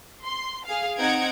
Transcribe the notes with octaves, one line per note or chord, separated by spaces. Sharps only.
C6
G#4 F5
C4 D#4 F#5 G#6 D7